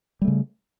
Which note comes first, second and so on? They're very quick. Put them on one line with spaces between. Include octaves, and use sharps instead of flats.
G3 A3 C#3